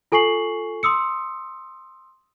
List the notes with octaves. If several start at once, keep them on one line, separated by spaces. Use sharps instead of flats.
F4 A4 G#5 C#6 C7 F#7
C6 D#6 E6 C#7